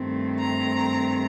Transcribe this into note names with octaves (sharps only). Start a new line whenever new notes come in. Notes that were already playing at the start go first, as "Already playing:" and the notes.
Already playing: G2 D#3 A3 C4
A#5